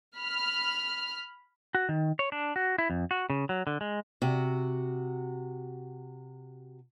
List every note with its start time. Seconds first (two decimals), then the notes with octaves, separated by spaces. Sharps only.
0.16 B5 F6
1.75 F#4
1.89 D#3
2.19 C#5
2.32 D4
2.56 F#4
2.78 E4
2.90 F2
3.11 F#4
3.30 C#3
3.49 F#3
3.67 D3
3.81 G#3
4.22 C3 F#4